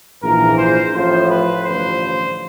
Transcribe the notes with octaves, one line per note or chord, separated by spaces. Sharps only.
A#1 G#2 E3 A#4
C5
A1 A2 F3 C5
B4
A1 G2 D3 F3 C5